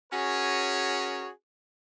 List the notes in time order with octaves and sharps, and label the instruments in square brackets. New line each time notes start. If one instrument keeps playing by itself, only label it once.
[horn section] C#4 F#4 G#4 A#4 C#5